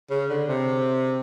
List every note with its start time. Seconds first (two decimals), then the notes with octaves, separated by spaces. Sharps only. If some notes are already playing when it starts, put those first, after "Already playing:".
0.10 C#3
0.29 D3
0.48 C3